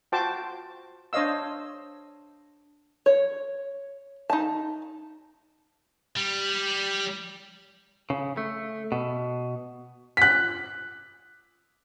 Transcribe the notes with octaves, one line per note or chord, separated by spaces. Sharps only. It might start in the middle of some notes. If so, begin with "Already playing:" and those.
F4 F#4 C5 G5 A5 D6
D4 C5 C#5 D#5 F5 E6
C#5
D#4 A5
G3
C#3
A3
B2
F#6 B6